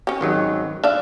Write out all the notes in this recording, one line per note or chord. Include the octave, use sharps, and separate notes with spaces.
C#4 G4
G#1 D#3 F#3
D4 E5 F5